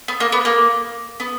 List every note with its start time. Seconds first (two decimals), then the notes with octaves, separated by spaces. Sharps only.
0.08 B3
0.20 A#3
0.32 B3
0.45 A#3
1.20 B3